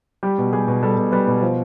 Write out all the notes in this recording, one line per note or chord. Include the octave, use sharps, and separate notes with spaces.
G3 G4
B2
G3 G#4
B2
G3 A4
B2
G3 B4
B2
F3 C5